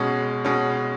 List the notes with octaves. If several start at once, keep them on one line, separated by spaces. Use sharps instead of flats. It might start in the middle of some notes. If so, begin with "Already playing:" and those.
Already playing: B2 G#3 C#4
B2 G#3 C#4